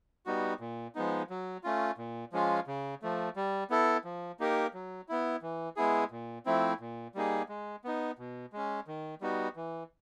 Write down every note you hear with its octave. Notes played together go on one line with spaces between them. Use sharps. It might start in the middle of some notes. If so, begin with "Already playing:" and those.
G3 B3 D#4 F#4
A#2
F3 G#3 B3 D#4
F#3
A3 C#4 F4
A#2
F3 G#3 C#4 F4
C#3
F3 A3
G3
B3 E4 A4
F3
A#3 D#4 G4 A#4
F#3
B3 E4
E3
G#3 B3 E4 G#4
A#2
F3 A3 C4 E4
A#2
G3 A#3 D#4 G#4
G#3
B3 D#4
B2
G#3 C#4
D#3
G3 B3 D#4 F#4
E3